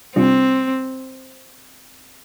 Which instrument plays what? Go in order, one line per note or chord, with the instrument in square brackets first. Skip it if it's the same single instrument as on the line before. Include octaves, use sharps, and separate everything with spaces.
[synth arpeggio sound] C3 G3 D4 F4 [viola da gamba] C4